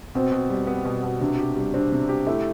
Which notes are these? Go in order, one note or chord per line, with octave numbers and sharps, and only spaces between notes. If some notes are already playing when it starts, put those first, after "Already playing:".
B2 C4
B2
G3
B3
B2
B2
C3 D4
G4
G3
C4 D4
C3
G4
A3 E4